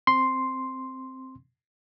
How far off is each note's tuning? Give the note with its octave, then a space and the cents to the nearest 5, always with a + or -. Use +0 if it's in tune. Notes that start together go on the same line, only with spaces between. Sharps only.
C4 +0 C6 +0